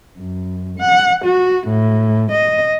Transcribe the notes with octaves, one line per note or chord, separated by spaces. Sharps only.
F#2
F#5
F#4
A2
D#5